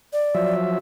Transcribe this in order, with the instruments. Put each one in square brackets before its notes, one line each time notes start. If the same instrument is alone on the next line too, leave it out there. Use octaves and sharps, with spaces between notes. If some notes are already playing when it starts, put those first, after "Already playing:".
[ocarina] D5
[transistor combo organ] F3 F#3 E5